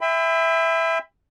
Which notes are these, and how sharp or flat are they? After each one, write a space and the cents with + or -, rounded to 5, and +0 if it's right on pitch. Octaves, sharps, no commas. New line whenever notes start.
E5 +0 G5 +40 B5 +30